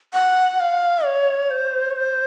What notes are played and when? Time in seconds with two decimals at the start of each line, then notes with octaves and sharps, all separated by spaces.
0.13 F#5
0.60 F5
1.05 C#5
1.51 C5
1.91 C#5
1.96 C5